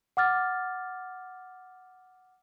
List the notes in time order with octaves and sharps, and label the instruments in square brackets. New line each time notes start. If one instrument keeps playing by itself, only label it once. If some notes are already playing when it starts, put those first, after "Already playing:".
[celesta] F#5 D6 F6 A6